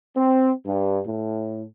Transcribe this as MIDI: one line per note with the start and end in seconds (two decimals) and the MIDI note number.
0.17 0.51 60
0.66 1.00 43
1.07 1.64 45